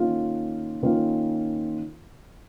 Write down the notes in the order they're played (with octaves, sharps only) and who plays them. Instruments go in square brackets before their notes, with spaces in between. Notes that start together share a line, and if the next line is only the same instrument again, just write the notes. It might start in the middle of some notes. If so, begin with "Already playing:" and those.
Already playing: [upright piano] D#3 A#3 C#4 F4
D#3 A#3 C#4 F4